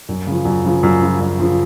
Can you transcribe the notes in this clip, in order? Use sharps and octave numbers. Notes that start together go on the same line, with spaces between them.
F#2
C#3 F3
F#2
C#3 F3
F#2
C#3 F3
F#2
C#3 F3